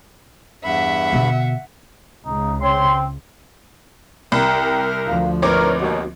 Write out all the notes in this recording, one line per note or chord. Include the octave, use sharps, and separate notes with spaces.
E2 G2 E5 F#5 B5
B2 D3
C#2 C#3 D#4
C4 C#5 C6
C2 A#4 G5
D2 F3 F5
G#1 A#4 B4 C#5 D6
D#2 B2 F#4